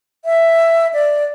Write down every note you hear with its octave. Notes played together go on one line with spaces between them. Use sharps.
E5
D5